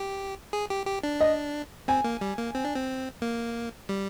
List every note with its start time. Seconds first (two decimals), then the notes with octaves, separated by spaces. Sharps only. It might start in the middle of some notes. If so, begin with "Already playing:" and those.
Already playing: G4
0.53 G#4
0.70 G4
0.87 G4
1.03 D4
1.21 D#5
1.88 C4 G#5
2.04 A#3
2.21 G3
2.38 A#3
2.55 C4
2.64 D4
2.75 C4
3.22 A#3
3.89 G3